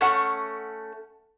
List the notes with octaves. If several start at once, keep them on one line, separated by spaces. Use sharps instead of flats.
A3 C#4 F#5